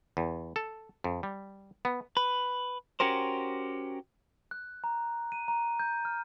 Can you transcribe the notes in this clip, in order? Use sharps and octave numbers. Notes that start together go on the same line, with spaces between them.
E2
A4
F2
G3
B3
B4
C#4 F#4 G4 A#4 C5
F#6
A#5
D#7
A#5
G6
F6